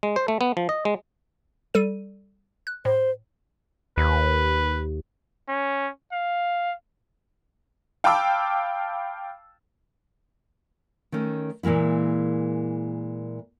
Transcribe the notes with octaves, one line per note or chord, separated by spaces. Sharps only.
G#3
C5
A3
B3
F3
D#5
G#3
G3 A4 D#7
F#6
A2 C5
D#2 B4
C#4
F5
F5 G5 A5 B5 D6 E6
D#3 A3 C#4
A#2 E3 G#3 A#3 E4